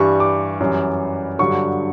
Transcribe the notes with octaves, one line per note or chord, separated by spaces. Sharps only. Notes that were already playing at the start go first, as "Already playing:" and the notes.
Already playing: G2 E3 G3 C#6
D6
F#2 E3 G3
G2 D3 F#3 C#6